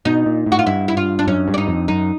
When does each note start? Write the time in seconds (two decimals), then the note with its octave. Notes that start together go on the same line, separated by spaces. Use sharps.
0.05 B2 D#4
0.26 A#2
0.46 A2
0.52 F#4
0.59 F4
0.66 G2 E4
0.88 E4
0.97 F4
1.19 D4
1.27 F#2 C#4
1.48 G2
1.54 D4
1.58 D#4
1.68 F2
1.88 F#2 D#4